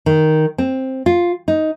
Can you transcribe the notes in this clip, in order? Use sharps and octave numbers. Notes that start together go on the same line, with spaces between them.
D#3
C4
F4
D#4